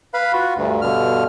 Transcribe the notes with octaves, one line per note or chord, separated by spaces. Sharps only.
B4 F5 B5
F4 F#4
D2 G2
G2 B2 D3 F6